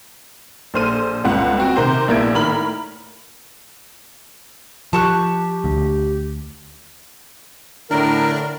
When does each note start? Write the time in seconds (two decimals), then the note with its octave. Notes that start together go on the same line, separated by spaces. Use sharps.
0.74 A#1 A4 C5 F6 D#7
1.24 G1 C#2 F#5
1.58 C4 F#4 G5
1.76 C3 D#3 A#4 C5 G6
2.08 A#1 A#3 B3 E4 G#6 D7
2.34 A2 D#3 A#5 B5 F6 F#7
4.93 F3 G4 A5 C#6 F#6
5.64 D2
7.91 A2 D3 D4 A#4